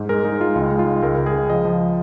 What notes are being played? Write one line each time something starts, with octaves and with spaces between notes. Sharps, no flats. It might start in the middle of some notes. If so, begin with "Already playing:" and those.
Already playing: G#2
G#3 A#4
G#3 D#4
G#3 F4
C#2 D#4
G#3
F4
G#3
C#2 A#4
C#2
G#4
C#2
F3 D#5
F3